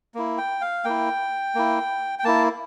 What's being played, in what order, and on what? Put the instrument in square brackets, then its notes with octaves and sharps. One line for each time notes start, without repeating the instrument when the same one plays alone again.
[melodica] A#3 E4
G5
F5
A#3 E4 G5
A#3 E4
G5
A#3 E4 A5